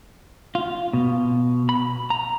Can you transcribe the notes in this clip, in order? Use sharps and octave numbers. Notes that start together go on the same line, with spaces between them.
F4
B2
B5
A#5